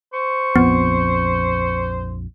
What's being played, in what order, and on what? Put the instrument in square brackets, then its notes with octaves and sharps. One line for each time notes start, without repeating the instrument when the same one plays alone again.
[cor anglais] C5 [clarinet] C#6
[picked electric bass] A#1 F2 [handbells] B3